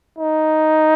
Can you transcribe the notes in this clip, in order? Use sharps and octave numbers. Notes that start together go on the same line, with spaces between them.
D#4